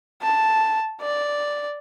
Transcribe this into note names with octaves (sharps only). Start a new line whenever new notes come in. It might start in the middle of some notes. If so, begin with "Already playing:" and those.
A5
D5